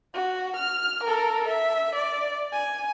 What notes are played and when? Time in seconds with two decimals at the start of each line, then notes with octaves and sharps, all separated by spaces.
0.14 F#4
0.56 F6
1.04 A4 A#4
1.48 E5
1.95 D5
2.52 G#5